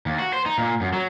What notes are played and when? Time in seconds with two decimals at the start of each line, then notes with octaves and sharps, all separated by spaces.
0.06 D#2
0.19 F#4
0.33 C5
0.46 D#4
0.58 A#2
0.81 F#2
0.93 F#3